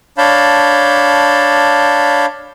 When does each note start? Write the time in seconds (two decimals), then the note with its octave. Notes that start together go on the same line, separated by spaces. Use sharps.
0.18 D4 C#5 F5 A5 B5 G6